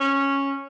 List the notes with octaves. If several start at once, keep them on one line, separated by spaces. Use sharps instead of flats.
C#4